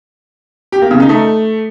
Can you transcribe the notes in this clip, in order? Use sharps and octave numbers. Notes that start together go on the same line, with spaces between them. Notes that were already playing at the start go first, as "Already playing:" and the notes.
G4
A#3
C#3
D#4
A3